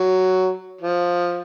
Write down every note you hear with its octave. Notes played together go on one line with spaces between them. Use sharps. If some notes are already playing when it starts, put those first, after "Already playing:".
Already playing: F#3
F3